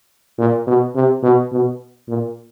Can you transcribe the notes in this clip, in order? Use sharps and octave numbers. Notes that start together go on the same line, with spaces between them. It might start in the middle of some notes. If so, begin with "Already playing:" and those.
A#2
B2
C3
B2
B2
A#2